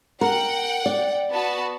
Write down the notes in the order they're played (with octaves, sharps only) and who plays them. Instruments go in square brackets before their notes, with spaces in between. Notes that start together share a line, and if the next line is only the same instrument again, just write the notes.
[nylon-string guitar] A#4 [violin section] F#5 G5
[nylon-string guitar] D5
[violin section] B3 F#4 A5